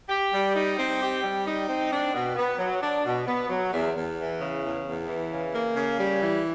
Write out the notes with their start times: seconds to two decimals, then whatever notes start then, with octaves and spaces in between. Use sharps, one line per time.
0.09 G4
0.32 G3
0.55 D#4
0.78 C4
1.00 G4
1.23 G3
1.46 D#4
1.68 C4
1.91 D4
2.14 B2
2.36 B3
2.58 F#3
2.81 D4
3.05 B2
3.27 B3
3.49 F#3
3.72 E2
3.95 E2
4.18 E3
4.40 C#3
4.62 E2
4.85 E2
5.07 E3
5.31 C#3
5.53 A#3
5.76 C#3
5.98 G3
6.22 E3